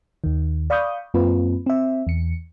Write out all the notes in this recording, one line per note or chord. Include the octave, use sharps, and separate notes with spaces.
D#2 D#3
D5 F5 B5 C#6 D#6 G6
F#2 A#3 C4 F4 B4
C4 E5
E2 C#7